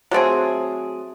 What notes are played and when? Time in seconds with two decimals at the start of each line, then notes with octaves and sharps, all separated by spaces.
0.11 F#3 A3 C4 G#4